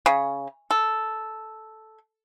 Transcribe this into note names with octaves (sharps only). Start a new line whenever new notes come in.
C#3
A4